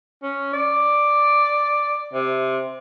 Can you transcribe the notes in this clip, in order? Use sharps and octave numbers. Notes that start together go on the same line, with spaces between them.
C#4
D5
C3